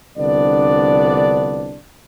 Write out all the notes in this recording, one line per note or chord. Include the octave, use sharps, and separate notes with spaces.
C2 D3 F3 B3 D4 D5